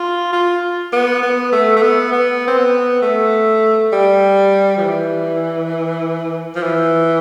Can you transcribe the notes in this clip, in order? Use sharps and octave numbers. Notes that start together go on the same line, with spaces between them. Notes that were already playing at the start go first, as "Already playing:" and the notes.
Already playing: F4
F4
B3
B3
A3
A3
B3
B3
C4
B3
A3
G3
F3
E3
F3
E3